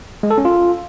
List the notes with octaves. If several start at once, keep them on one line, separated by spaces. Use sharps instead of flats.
G#3
A4
C#4
F4